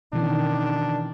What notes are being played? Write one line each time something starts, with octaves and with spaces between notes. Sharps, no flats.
B2 D#3 E3 C#4 D4